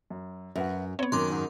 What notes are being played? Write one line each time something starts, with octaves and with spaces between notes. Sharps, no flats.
F#2
F#2 F#4 B4 E5
B3 C4 C#5
F#2 D#3 C6 D6
G#2